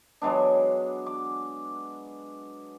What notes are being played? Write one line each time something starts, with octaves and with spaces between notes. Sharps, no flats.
F#3 G#3 B3 D4
D6